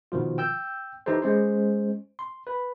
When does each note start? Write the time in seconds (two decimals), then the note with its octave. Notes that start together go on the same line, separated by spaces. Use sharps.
0.12 B2 D#3 F3 F4
0.38 G5 E6 G6
1.06 E3 D#4 G4 A4 C5
1.22 G#3 C#4 C5
2.19 C6
2.47 B4